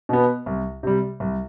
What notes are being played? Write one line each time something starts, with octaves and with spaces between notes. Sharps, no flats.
B2 B3
C2
C3 G3
C2